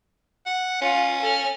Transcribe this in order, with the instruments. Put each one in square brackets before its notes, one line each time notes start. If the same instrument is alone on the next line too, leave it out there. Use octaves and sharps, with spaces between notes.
[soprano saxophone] F#5
[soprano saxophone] C#4 [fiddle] F4
[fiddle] A4 F6